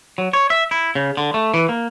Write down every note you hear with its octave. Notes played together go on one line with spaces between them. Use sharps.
F#3
C#5
E5
E4
C#3
D3
A3
E3
A#3